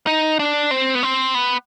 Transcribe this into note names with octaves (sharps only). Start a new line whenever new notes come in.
D#4
D4
C4
B3
C4
B3